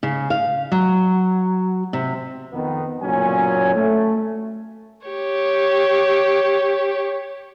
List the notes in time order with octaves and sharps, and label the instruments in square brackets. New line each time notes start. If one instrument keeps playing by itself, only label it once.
[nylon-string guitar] C#3
F5
F#3
C3
[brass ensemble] F2 D#3 B3
F#1 B1 A#2 F#3 C#4 G#5
A3
[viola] G4 C#5